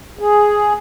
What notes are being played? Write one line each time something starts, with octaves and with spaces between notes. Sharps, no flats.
G#4